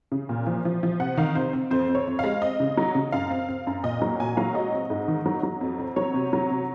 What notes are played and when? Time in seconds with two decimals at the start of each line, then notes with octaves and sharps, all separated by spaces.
0.12 C#3
0.29 A#2
0.47 F3
0.65 F3
0.83 F3
1.00 C3 F#5
1.17 D#3 F5
1.35 C3 C5
1.53 C4
1.71 F2 C5
1.88 F2
1.95 C#5
2.07 F2
2.19 G#3 F5
2.42 C4 D#5
2.60 C#3
2.77 F#3
2.95 C#3
3.12 F#2 F5
3.30 C4
3.49 C4
3.67 F#2
3.83 A#2 D#5
4.02 F#3
4.20 A#2 G#5
4.37 F#3 F5
4.54 G#3 D#5
4.72 C4
4.90 G#2
5.08 D#3
5.26 F#3
5.43 F#3
5.61 F2
5.79 C4
5.96 F#3 C#5
6.14 C3
6.33 F#3
6.51 C3